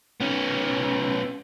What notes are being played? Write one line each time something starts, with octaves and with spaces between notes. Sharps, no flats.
B3 C#4